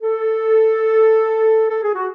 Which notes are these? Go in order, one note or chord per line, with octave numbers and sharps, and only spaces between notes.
A4
A4
G#4
F#4